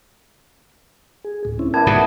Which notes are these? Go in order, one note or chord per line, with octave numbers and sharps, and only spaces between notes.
G#4
D2 A2
C4 C#4 E4
G3 B3 E4 A#4 A5 G#6
G#2 B2 F#5 G5 D#6